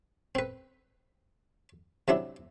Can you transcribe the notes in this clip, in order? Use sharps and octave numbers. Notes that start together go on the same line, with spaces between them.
C4 B4
C3 F#3 D4 E4